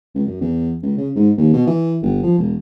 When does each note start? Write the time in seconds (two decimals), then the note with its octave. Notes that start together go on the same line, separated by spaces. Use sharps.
0.15 C#2
0.27 F#2
0.41 E2
0.83 C#2
0.97 C#3
1.16 G#2
1.37 D#2
1.54 B2
1.67 E3
2.02 G1
2.23 F3
2.38 E1